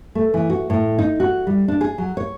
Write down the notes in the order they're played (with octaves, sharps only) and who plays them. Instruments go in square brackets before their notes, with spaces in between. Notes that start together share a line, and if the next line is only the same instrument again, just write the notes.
[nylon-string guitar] A3
E3
F#4
A2
D#4
F#4
G3
D4
G#4
F#3
C#5